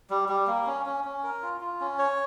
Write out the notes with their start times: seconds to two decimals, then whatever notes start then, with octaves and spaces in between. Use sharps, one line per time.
0.10 G3
0.29 G3
0.47 A#3
0.67 C#4
0.86 C#4
1.04 C#4
1.23 A#4
1.42 F4
1.61 F4
1.81 C#4
1.99 C#5